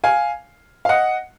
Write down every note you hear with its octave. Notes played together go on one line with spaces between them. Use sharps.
F5 G#5
F5
D#5 F#5